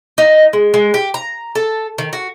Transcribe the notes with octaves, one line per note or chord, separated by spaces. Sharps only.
D#4
G#3
G#3
G4
A#5
A4
D#3
F#4